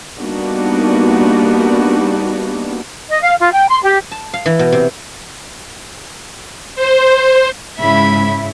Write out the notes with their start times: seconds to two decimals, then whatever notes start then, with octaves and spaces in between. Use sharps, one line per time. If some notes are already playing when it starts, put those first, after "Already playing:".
0.19 G3 A#3 B3 D4 D#4 F#4
3.10 D#5
3.22 F5
3.40 F4
3.53 G5
3.68 C6
3.82 G4
4.11 A5
4.34 F5
4.46 E3
4.59 B2
4.72 C3
6.76 C5
7.78 G#2 C#3 E4 E5 B5